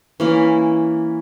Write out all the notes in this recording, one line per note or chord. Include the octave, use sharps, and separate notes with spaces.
E3 A#3 C#4